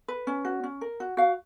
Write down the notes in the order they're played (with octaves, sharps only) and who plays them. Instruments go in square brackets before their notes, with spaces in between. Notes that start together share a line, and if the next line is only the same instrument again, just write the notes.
[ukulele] B4
C#4
F#4
C#4
A#4
F#4
F#4 F5